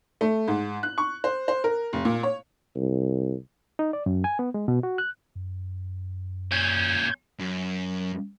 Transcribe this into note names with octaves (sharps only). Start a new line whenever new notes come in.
A3
G#2
F#6
C#6
C5
C5
A#4
F1
A#2
C#5
C2
D#4
D5
F#2
G#5
B3
G#3
B2
F#4
F#6
F#2
A#2 C#4 G6 G#6
F#2